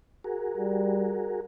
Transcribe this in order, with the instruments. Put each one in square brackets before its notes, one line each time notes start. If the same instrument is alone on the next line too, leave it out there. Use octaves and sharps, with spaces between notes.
[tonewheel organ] F#4 G#4 A#4
[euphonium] G3